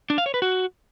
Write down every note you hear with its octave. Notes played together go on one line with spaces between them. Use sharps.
D4
F5
C#5
B4
F#4